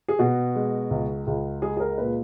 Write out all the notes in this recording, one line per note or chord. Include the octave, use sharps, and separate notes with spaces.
G#4
B2 F#4
G#3
C#2
C#2
G#3 G#4
G#4
A#4
A#2 B4